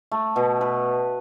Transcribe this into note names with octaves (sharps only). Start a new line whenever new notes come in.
A3
B2
B4